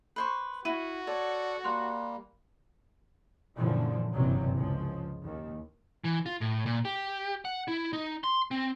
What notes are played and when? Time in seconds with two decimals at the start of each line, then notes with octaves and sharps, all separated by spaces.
0.16 B4 C5 C#6
0.65 E4 F#4 D#7
1.07 A4 C#5 D5
1.64 G3 A#3 C6 F#6
3.56 F#2 A#2 D3 E3 F3 G3
4.13 F#1 G2 C3 E3 F#3
4.56 C#2 F3
5.21 D#2
6.04 E3
6.26 F4
6.41 A2
6.66 A#2
6.85 G4
7.45 F#5
7.68 E4
7.93 D#4
8.24 C6
8.51 C4